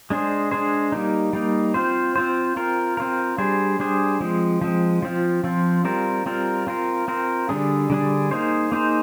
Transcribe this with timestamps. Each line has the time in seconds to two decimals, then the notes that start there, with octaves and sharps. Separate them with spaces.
0.10 G#3 D4 G#4 C5
0.51 G#3 D4 G#4 C5
0.92 G3 A#3 D#4
1.33 G3 A#3 D#4
1.74 C4 F4 C5
2.16 C4 F4 C5
2.57 C4 F4 A#4
2.97 C4 F4 A#4
3.38 G3 D4 G#4 C5
3.79 G3 D4 G#4 C5
4.20 F3 G#3 C4
4.61 F3 G#3 C4
5.02 F3 C4 F4
5.44 F3 C4 F4
5.85 G3 C4 F4 A#4
6.26 G3 C4 F4 A#4
6.67 C4 F4 A#4
7.08 C4 F4 A#4
7.49 D3 G3 D4 G#4
7.90 D3 G3 D4 G#4
8.31 A#3 D#4 G#4 C5
8.72 A#3 D#4 G#4 C5